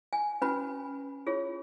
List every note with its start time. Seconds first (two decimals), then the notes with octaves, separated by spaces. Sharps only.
0.13 G#5
0.42 C#4 F#4 B4 B5
1.27 F4 G#4 C#5